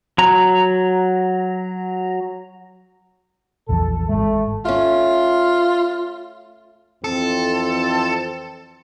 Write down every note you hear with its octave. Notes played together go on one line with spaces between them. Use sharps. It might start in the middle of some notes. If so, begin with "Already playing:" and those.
F#3 A#5
A#1 E2 F3 A4
G#1 G#3 A3
A3 C#4 F4
F2 E3 C4 A4